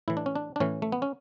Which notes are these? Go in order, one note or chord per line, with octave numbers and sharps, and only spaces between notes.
A2 E3 E4
D4
C#4
D4
D4
A2 E3 C#4
A3
B3
C#4